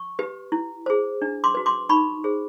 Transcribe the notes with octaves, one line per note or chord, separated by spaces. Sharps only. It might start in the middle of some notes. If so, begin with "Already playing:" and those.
Already playing: C#6
G4 B4
E4
G#4 C5
D4
C6 D6
F#4 B4
C6 D6
D#4 B5 C#6
G#4 C5